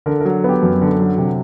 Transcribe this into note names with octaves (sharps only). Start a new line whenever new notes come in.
D3 A#4
A#4
F#3
B3 G4
F#2
D3
F#3
C3